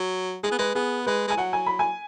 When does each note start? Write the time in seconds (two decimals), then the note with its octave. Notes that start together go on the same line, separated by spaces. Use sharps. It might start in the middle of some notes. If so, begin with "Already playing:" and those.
Already playing: F#3
0.43 G#3 G#4
0.51 B3
0.59 G#3 B4
0.75 B3 G#4
1.06 G#3 B4
1.27 G#3 G#5
1.37 F#3 F#5
1.53 G#5
1.66 B5
1.79 G#5